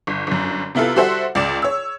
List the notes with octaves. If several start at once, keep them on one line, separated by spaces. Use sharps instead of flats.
G1
G1 F#2
C3 B3 E4 F4 A4
G3 F#4 A4 C5 E5 F#5
C#2 D5 E7
C#5 E6